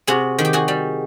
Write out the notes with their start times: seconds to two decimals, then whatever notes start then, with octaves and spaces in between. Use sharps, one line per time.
0.07 C3 F#4 G#4
0.38 D#3
0.45 G4
0.53 F#4 G#4
0.68 G3